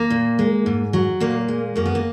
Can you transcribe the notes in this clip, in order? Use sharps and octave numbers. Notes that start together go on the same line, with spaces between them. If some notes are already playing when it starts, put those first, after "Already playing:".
Already playing: A#3
A#2
G#3
G#2
F#3
A#2 A#3
G#3
F#2 A#3
B3
A#3